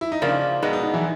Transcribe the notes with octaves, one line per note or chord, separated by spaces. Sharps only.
E4
D#4
C#3 F3 A#3 D4
B2 G#3 B3 D#4
D#4
D#4
E3 E4